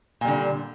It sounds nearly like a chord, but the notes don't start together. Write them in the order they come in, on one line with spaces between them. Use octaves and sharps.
A#2 G3 D3